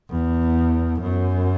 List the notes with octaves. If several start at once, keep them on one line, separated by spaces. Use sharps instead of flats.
E2
F#2